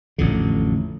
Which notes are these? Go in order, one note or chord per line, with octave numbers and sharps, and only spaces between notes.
A1 F2 D3